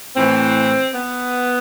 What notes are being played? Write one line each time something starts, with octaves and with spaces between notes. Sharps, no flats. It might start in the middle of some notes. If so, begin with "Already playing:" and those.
A2 E3 C4
B3